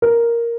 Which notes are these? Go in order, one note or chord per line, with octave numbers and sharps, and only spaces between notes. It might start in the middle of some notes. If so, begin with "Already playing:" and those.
A#4